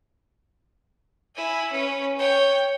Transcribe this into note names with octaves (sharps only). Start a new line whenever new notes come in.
E4 G#5
C#4 B4
C#5 G5